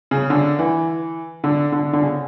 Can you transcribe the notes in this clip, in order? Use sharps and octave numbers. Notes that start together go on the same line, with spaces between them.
C#3
D3
E3
D3
D3
D3
C#3